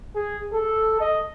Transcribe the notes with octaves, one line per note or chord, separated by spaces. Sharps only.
G#4
A4
D#5